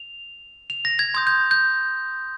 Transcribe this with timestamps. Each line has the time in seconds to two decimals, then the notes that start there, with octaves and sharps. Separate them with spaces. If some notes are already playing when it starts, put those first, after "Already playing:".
Already playing: F7
0.70 F7
0.85 A#6
0.99 G#6
1.14 C6 D#6 G6 G#6
1.27 G6
1.51 G6